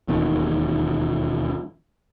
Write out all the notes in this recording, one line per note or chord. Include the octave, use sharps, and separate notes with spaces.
E1 D#2 B2 D#3